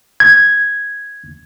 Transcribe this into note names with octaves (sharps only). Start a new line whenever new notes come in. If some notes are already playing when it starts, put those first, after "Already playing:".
G#6